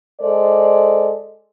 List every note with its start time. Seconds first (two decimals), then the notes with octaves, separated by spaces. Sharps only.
0.21 G#3 A4 C5 D5